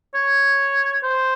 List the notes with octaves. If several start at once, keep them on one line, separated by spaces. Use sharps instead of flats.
C#5
C5